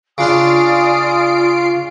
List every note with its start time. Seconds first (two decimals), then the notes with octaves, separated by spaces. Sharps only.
0.18 C#3 D4 F4 D5 G#5 D#6 C7 D7